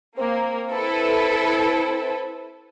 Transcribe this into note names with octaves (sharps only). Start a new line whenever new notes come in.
A#3 C4
E4 A4 B4